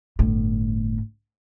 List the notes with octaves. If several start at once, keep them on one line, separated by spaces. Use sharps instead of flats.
G1 A2